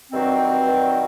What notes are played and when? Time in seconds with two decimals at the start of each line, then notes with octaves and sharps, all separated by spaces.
0.11 G2 D#3 F#3 C4
0.66 G2 D#3 F#3